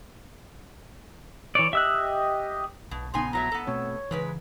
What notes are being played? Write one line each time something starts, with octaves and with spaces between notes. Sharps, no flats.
E3 C#5 D5
G4 D#5 E5 E6 F#6
B1 B2
A#1 C#3 B3 D#4 G#5 C6
A2 F#3 E5 A#5
B3 A4
B2 A3 C4 C#5
G#2 C#3 E3 G#3 B4